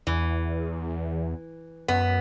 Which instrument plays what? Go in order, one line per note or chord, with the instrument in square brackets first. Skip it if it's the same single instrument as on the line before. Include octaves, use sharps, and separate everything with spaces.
[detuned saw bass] E2 [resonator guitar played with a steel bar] E3
[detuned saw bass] F#2 [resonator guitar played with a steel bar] B3